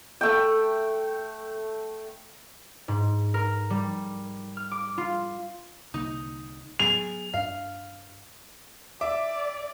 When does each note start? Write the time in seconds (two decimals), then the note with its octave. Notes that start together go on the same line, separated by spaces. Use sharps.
0.21 A3 F#5 G5
2.88 G#2
3.34 A#4
3.70 G3
4.57 F6
4.71 D6
4.98 F4
5.94 C2 D3 A#3 D#4
6.79 F#3 B3 G#4 F7
7.34 G2 D4 F5
9.01 D5 E5 D6